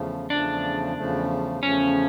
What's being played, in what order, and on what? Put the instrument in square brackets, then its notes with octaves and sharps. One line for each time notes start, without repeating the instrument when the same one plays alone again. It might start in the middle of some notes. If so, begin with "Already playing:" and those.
Already playing: [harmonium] E2 C#3 F3 A3
[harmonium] E2 C#3 F3 A3 [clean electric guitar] D4
[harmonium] E2 C#3 F3 A3
[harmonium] E2 C#3 F3 A3 [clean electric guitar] C#4